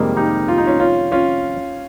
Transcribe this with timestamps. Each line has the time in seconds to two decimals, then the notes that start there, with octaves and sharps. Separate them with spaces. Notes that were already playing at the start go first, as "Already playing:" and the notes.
Already playing: F2 C3 D#3 G3 G#3 A#3
0.17 D#4 G4
0.48 F4
0.58 D#4
0.67 C#4 F4
0.80 C#4 F4
1.12 C#4 F4